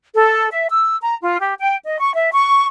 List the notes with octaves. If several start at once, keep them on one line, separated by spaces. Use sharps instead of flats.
A4
E5
E6
A#5
F4
G4
G5
D#5
C#6
E5
C#6